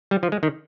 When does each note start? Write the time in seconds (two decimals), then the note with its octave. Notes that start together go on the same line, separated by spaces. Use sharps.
0.11 G3
0.23 F3
0.32 G#3
0.43 D#3